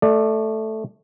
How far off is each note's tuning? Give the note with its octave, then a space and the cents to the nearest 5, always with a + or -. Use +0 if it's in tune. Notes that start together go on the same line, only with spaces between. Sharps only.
A3 +0 D5 +25